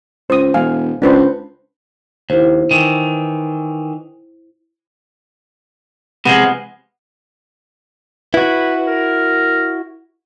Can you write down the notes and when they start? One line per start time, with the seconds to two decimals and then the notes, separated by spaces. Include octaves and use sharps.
0.30 C#2 C5 D#6
0.54 E1 F5 G#5
1.02 C#2 D4 B4 C5
2.30 D#2 E4 C5
2.71 D#3 E3
6.25 C3 F3 G#3 B3
8.34 E4 F#4 B4
8.88 A#4